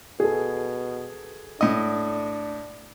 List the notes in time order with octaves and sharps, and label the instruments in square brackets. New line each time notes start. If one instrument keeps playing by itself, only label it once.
[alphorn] B2 [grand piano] G#4 A4
[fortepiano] A2 D#5 [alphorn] D4